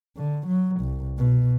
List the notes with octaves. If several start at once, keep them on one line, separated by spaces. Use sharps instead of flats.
D3
F#3
C2
B2